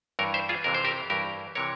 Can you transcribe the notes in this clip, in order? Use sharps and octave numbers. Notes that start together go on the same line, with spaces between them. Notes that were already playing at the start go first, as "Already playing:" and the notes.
G2 E3 A#4 C#5
C5 E5
F4 G#4
F2 C3 E3 A#4
C5
G4 A#4
G2 E3 G4 A#4
C3 E3 A#4 C#5